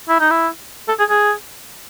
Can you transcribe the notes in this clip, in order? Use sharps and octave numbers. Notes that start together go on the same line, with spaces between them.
E4
D#4
E4
A4
G#4
G#4